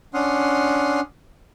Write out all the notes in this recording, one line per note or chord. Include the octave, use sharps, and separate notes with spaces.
C#4 D4 F#5 C6 D#6 F6